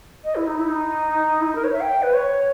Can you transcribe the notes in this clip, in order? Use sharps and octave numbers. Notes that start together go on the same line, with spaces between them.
D#5
E4
D#4
E4
D#4
E4
D#4
A#4
C#5
E5
G5
B4
C#5